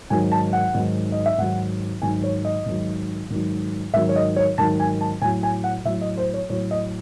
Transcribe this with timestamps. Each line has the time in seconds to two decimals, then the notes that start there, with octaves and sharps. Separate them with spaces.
0.10 G#2 D#3 F#3 G#5
0.32 A5
0.53 F#5
0.74 G#2 D#3 F#3
1.12 D#5
1.26 E5
1.38 G#2 D#3 F#3 F#5
2.02 G#2 D#3 F#3 G#5
2.23 C#5
2.45 D#5
2.66 G#2 D#3 F#3
3.30 G#2 D#3 F#3
3.94 G#2 D#3 F#3 E5
4.09 C#5
4.16 D#5
4.36 C#5
4.58 G#2 D#3 F#3 A5
4.80 G#5
5.01 A5
5.21 A2 G#5
5.24 F#3
5.43 G#5
5.64 F#5
5.85 A2 F#3 E5
6.01 D#5
6.18 C5
6.34 C#5
6.50 A2 F#3 C#5
6.71 D#5